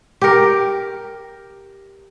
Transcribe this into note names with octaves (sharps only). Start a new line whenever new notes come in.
G4 A#4